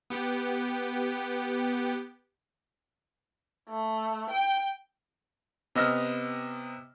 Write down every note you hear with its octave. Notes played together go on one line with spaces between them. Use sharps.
B3 G4
A3
G5
C3 B3 D#5 E6 F6 A#6